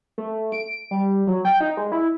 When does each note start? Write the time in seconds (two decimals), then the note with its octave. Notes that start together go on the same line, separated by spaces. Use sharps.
0.18 A3
0.52 D7
0.91 G3
1.27 F#3
1.45 G5
1.60 D#4
1.77 G#3
1.92 E4